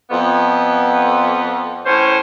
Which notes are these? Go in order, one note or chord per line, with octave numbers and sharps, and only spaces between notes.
F2 B3
A2 C#4 C5